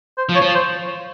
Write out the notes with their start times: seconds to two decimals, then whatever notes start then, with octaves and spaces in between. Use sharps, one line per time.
0.18 C5
0.29 F3
0.35 C#5
0.42 F3
0.55 C5